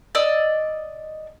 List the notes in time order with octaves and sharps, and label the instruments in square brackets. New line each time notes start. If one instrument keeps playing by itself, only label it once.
[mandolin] D5 D#5 E6